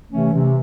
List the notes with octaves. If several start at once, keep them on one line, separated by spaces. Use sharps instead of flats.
C3 E3 A3 C#4
C3